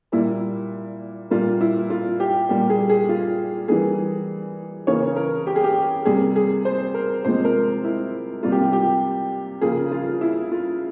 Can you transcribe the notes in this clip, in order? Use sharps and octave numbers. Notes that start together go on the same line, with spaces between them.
A#2 G3 A#3 E4
A#2 G3 A#3 F4
E4
F4
G4
A#2 G3 A#3 G4
G#4
G#4
F4
E3 G3 A#3 G#4
C#3 E3 A#3 C#5
A#4
G4
G#4
G4
C3 G3 A#3 G#4
G#4
C5
A#4
C3 F3 G#3 C5
A#4
E4
C3 G3 A#3 F4
G4
F4
G4
C#3 F3 A#3 G#4
F4
E4
F4